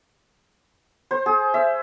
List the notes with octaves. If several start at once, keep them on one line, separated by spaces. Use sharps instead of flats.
C5
G#4
E5